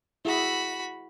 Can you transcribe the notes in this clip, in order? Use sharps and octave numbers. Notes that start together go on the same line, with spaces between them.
E4 F#4 G#4 B5